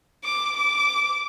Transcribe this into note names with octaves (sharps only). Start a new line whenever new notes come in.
D6
D6